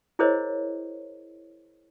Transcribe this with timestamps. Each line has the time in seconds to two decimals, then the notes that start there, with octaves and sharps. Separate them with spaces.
0.19 E4 G#4 A#4 C5 C#5 D#5